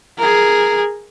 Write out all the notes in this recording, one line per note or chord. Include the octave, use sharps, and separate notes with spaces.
G#4 A#4